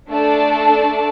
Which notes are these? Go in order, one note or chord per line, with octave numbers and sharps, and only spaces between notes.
A3 D4 A4 D5 A5